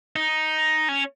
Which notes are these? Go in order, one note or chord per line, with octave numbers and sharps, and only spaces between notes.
D#4
C#4